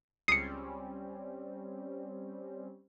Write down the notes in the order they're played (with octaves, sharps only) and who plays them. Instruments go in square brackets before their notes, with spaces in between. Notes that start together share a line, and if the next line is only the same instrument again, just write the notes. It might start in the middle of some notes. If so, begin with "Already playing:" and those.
[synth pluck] C#2 D#6 [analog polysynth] G3 C4 C#4 [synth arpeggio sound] C7 C#7